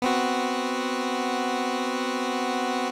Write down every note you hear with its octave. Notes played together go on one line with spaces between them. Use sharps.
B3 C4 F#4